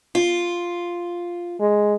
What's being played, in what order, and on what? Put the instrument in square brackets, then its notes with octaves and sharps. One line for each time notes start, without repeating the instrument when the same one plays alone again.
[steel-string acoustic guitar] F4
[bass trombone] G#3